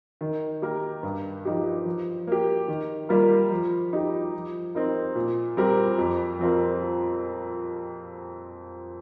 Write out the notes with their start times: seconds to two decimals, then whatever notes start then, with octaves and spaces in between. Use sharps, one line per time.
0.21 D#3
0.62 A#3 G4 A#4
1.03 G2
1.45 F3 D#4 G4
1.86 F3
2.27 A#3 G4
2.68 D#3
3.09 G3 A#3 F4 A#4
3.51 F3
3.93 D#4 G4
4.33 F3
4.75 C4 D#4 A#4
5.15 A#2
5.57 G3 C4 G4 A#4
5.99 F2
6.39 F3 C4 F4 A#4